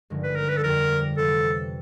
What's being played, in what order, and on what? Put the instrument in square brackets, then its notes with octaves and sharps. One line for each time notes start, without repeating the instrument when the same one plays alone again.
[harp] G#1 G2 D3 F3 G#3
[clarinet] B4
A#4
B4
A4
[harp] F2 D3 G3 B3 [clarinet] A#4
[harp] F2 C3 E3 [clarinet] A4